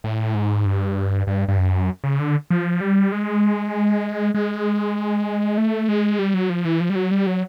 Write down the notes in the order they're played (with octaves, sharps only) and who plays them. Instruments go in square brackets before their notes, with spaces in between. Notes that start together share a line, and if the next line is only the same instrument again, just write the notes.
[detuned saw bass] A2
G#2
G2
G2
G2
F#2
C#3
D3
F3
G3
G#3
G#3
A3
G#3
G3
F#3
F3
E3
F3
G3
F#3
G3
F#3